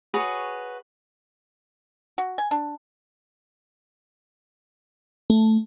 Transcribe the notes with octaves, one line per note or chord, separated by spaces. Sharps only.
F#4 G#4 B4 C#5
F#4
G#5
D4
A3